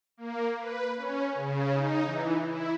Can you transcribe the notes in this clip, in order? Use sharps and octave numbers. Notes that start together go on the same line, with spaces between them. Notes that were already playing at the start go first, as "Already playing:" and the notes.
A#3
B4
C#4
C#3
D#4
E3
E4